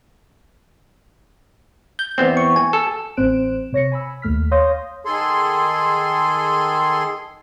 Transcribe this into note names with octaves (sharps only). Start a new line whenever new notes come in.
G6
E2 B3 C4
C#6
G#5
A4
A1 C4 C5 F#6 D7 E7
C3 C#5 A#6 C#7
G#5 B5 E6
D#2 A3 F6 B6
C#5 F5 C6 D#6 G6 A#6
D#3 G#4 A4 C6